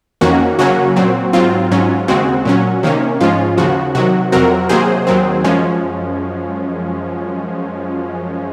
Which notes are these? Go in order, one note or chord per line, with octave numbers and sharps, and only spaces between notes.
F2 D#3 A#3 C#4 F#4
C#3 F#3 A#3 C#4 F#4
A#2 F#3 C4
G#2 F#3 C4 F4
G#2 F#3 C#4
D#2 C#3 G#3 C4 F#4
A#2 F#3 C#4
C3 D#3 A#3 C#4
G#2 F3 G#3 C#4 F4
D#2 C#3 F3 F#4
C3 D#3 F#3 F#4
F2 C3 F#3 C4 F#4 A#4
C3 D#3 F#3 A#3 G#4 C5
D#2 D#3 F#3 C4
F#2 F3 G#3 C#4